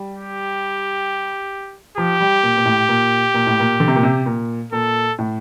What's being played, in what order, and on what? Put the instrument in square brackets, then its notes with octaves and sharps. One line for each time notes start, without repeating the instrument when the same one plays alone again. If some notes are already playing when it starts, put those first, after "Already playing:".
Already playing: [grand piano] G3
[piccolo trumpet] G4
[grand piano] F3 [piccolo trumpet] G4
[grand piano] G3
A#2
A#2
A2
A#2
A#2
A2
A#2
D3
C3
A#2
C3
A#2
[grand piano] A#2 [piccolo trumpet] A4
[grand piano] A2